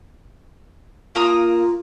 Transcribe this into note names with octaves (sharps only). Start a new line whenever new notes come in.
A#3 F4 A#5 D#6